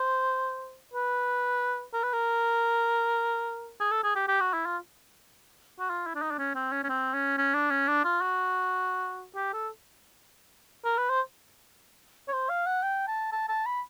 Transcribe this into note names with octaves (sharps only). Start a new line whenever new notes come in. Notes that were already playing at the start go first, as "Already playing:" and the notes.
Already playing: C5
B4
A#4
B4
A#4
G#4
A4
G#4
G4
G4
F#4
E4
F4
F#4
F4
E4
D4
D#4
D4
C#4
C4
C#4
C#4
C4
C#4
C#4
D4
C#4
D4
F4
F#4
G4
A4
A#4
B4
C5
C#5
C5
F5
F#5
G5
A5
A5
A5
B5